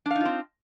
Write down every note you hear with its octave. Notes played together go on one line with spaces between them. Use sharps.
C4 D4 D#4 F4 F5